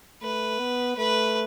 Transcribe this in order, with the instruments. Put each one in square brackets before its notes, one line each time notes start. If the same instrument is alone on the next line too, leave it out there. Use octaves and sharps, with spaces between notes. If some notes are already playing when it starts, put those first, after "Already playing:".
[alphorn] A3 [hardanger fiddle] B4
[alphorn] B3
[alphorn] A3 [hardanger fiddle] B4